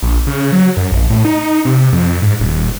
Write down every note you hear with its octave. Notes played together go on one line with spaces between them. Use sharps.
A#1
C#3
F#3
F#2
A#1
A2
D#4
C3
F2
G#2
D#1